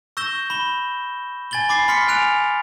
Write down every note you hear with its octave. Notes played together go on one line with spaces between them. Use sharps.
C#6 E6 G6 A#6 E7 G7
B5 E7 G7
G#5 G#6 A6 F#7 G7
B5 D6 A6 C7
B5 C6 F6 B6 C#7
G#5 F6 F#6 D7 F7